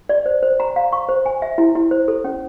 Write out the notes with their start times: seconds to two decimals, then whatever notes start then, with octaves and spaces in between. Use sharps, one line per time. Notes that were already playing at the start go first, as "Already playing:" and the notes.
0.09 D5
0.26 C5
0.43 C5
0.60 A#5
0.76 F5
0.92 C#6
1.09 C5
1.26 G#5
1.42 E5
1.58 E4
1.75 E4
1.91 C5
2.08 A4
2.24 C#4